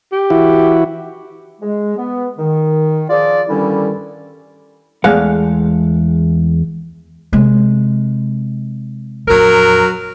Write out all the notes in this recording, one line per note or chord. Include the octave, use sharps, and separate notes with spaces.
G4
E3 E4 F#4
G#3
B3
D#3
F3 F4 G#4 D5
G2 D3 D#3 G3 C#4 E4
E2 G#3 A3 F5 F#5
C3 G#3
A#1 F2 F#3 A#4